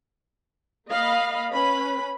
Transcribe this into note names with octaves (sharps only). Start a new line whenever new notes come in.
A#3 D#5 F5 B5
C#4 B4 B5